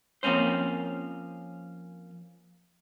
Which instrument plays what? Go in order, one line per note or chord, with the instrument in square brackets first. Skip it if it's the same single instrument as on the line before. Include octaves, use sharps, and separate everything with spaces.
[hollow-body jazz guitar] F3 A#3 C4 C#4 C5